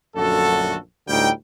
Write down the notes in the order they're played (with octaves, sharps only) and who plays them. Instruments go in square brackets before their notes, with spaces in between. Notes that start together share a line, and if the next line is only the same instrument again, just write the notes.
[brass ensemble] A#1 F#2 D3 A3 F#4 A4
D2 A2 G3 D#4 G5